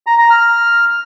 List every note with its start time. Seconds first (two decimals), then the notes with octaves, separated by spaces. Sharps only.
0.06 A#5
0.18 A#5
0.30 F6